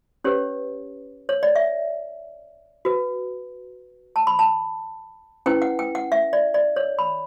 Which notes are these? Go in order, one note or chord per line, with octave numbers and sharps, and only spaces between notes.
C#4 G4 B4 C#5
C#5
D5
E5
F#4 B4
A5
B5
A5
C#4 E4 B4 G5
F#5
G5
F#5
E5
D5
D5
C#5
B5